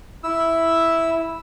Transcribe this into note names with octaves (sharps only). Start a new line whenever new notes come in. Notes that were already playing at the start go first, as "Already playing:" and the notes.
E4 E6